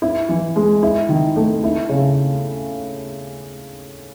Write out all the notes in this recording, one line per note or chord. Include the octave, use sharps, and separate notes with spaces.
E4
E3
G#3
E4
D#3
A3
E4
C#3